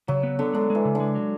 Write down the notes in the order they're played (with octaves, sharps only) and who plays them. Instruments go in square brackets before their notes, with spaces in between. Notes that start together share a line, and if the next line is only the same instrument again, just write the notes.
[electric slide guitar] C#3 [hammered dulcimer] F#3
[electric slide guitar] B3
[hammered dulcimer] D3 [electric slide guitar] B3
[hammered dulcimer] D3 [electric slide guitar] G#3
[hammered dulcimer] E3 [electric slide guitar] G#3
[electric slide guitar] C#3
[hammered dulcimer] D3
[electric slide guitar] G#3
F#3